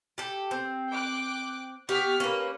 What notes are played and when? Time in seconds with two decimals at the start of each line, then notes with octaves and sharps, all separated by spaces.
0.18 G4 A4
0.51 C4
0.90 G5 D6 F#6
1.89 B3 G4 C#6 F6 B6
2.20 A#3 C#4 B4